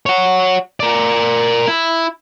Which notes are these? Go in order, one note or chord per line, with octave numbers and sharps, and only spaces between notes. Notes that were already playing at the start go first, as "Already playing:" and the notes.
C#5 F#5
A#4 D5
E4